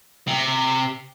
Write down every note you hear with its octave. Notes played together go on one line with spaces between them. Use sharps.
C3